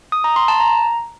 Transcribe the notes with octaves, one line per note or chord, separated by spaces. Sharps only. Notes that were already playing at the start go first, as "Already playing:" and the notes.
D#6
A#5
C6
A5
A#5